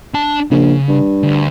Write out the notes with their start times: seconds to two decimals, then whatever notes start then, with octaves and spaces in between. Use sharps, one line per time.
0.14 D4 A5
0.51 A#1 C#3
0.88 G2
1.23 D2